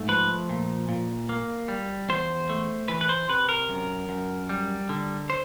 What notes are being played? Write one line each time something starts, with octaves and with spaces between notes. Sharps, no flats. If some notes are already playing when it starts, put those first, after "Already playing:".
Already playing: G#2 A3
F3 B4
A#2
A#2
A#3
G3
E2 C5
A3
E3 B4
B4
C5
C3 B4
A#4
F#2
F#2
G3
D3
C5